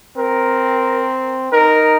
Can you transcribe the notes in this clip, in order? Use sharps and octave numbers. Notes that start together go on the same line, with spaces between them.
C4 A#4
D#4 A#4